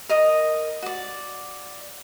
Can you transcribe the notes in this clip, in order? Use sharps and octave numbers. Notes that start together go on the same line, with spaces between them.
A#4 D#5 D#6
F#4 D5